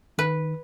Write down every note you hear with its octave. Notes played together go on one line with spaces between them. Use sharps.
D#3 B4